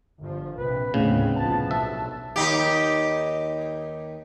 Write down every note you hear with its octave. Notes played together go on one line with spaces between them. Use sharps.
G1 F3
A#1 C3 B4
G1 D#2 A2 C#3 B3 C4
C2 G2 F3 A5
B1 E5
D#2 D#4 G4